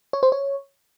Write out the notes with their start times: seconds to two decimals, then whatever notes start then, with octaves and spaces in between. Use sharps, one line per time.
0.13 C#5
0.23 C5
0.32 C#5